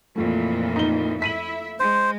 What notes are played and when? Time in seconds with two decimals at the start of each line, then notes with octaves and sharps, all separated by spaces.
0.16 F2 A#2 E3 A3 A#3 F4
0.76 D#4 G7
1.22 E4 E5 B6 D#7 F#7
1.80 G#3 C5